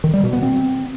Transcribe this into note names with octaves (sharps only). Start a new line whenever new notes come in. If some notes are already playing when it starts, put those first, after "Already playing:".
D#3
G3
B2
B3
C4